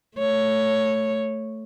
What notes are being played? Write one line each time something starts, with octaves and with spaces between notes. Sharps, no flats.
A3 C#5